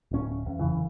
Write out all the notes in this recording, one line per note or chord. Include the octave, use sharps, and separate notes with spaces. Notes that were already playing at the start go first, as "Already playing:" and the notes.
D1 C#4
E2
F#1 D#2 C#3 E3